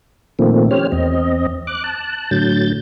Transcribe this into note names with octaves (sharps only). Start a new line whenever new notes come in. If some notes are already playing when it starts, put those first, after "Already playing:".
A#2 D#3 F3 A3 A#3 C4
C#4 G4 C5 C#5 F6
E2 C4 D#5
D6 F#6
A5 F#6
A2 D3 F#3 G6 A6